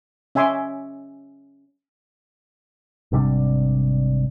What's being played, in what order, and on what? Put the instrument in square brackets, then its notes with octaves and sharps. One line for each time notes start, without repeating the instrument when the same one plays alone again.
[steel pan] C#4 E5 G#5 C6 D6
[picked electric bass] G#1 C3 G3 D4